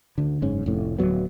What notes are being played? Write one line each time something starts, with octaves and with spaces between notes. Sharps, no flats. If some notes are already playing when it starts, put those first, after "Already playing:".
D2 D3
F#1 G#2 C#4
F1 A2
D1 E2 F#3 B3